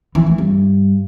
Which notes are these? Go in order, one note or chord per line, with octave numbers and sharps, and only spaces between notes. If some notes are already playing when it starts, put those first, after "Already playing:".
E3
A3
G2